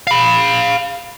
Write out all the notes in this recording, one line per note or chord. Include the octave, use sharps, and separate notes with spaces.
F5 B5